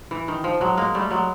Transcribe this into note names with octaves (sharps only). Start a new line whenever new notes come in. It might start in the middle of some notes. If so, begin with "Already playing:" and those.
E3
D#3
F3
F#3 G#3
G#3 A#3
G3 A3
F#3 G#3